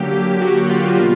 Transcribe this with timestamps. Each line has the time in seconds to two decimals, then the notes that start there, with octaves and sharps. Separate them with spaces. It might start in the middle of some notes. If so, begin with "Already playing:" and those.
Already playing: D3 F#3 A#3 G4
0.14 G4
0.42 F#4
0.69 F4
0.97 B2 G3 A#3